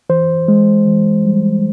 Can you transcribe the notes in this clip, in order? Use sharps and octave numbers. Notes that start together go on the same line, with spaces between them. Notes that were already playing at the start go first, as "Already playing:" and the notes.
E3 C5
G#3
E3
G3